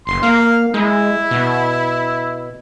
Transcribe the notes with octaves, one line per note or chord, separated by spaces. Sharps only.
F#1 C6
A#3 F5
G#3 E4
B2